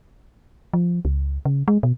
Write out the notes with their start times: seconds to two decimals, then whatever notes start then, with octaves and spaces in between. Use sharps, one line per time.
0.73 F3
1.05 C#2
1.45 C#3
1.68 G#3
1.83 B2